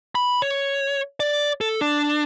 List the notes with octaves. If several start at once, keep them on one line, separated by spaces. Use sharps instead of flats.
B5
C#5
D5
A4
D4